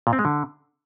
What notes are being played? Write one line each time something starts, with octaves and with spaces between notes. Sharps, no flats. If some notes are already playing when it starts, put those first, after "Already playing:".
A#2
C4
G#3
D3